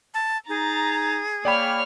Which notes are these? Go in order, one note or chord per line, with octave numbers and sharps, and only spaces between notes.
A5
D#4 G#4 A#5 A6
A#3 C#5 D5 G5 B5 F6